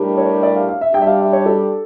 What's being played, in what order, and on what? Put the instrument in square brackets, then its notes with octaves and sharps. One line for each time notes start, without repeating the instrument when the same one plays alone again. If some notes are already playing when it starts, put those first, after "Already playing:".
Already playing: [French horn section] A2 G3 D4 G4 A#4
[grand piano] C#5
D5
F5
F5
E5
[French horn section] G3 D4 G4 [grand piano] G5
[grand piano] E5
F5
E5
C#5
A4